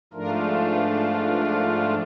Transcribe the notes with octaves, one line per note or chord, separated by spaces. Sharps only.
G#2 F3 A3 D4 F4 A#4
B4
C5
B4
A#4